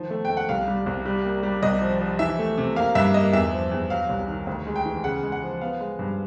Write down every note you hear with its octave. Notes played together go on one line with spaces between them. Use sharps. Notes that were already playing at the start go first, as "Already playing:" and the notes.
Already playing: D#3 F3
A3
G5
A3
F#5
C2 F5
G3
C2
G3
A#3
G3
C2 D#5
F3
F3
E3 E5
A3
C3
A#3 F5
G2 E5
A#3 D#5
E2 E5
F3
E2
F#3 F5
C2
D#3
D2
G#3
G5
E3
C#3 F#5
G#3
F#5
F3
B3 F5
G#3
G2